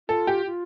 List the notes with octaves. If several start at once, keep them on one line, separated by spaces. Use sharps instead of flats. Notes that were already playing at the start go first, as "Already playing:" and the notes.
F4 A4
G4
F4